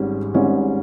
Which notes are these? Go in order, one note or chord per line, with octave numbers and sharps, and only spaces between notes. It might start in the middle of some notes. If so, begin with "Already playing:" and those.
Already playing: G#1 G#2 G3 C#4
G#1 G#2 G3 C#4